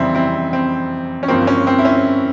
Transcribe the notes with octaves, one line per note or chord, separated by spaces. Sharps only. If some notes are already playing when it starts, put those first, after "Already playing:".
Already playing: F1 E2 C#3 G3 C4 E4
C4 E4
C4
C#4
G1 G2 F3 A#3 C4
C#4
C4
E4
C#4